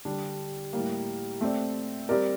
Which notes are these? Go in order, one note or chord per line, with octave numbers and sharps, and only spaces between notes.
D3 G3 D4
A2 G3 A#3
A3 C4 G4 D5
G3 C4 G4 A#4 D5